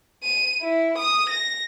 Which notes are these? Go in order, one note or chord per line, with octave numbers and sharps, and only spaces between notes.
D#7
E4
D#6
A#6